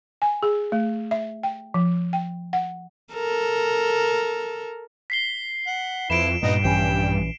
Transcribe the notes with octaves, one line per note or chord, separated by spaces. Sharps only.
G#5
G#4
A3
E5
G5
F3
G5
F#5
A4 A#4
B6 C7 G7
F#5
F2 E4 B4 D7 E7
G2 A#2 B3 D#4 D#5
A#1 E3 C#4 G5